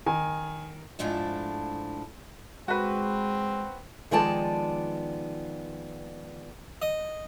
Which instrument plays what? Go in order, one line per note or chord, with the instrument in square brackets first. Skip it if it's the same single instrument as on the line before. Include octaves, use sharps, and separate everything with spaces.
[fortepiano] D#3 [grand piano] G#5
[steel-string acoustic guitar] G#2 F3 A3 D4 E4
[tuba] G#3 [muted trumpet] C4 [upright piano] F#4 B4
[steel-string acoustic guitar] D#3 F3 G#3 B3 D5 A5
[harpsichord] D#5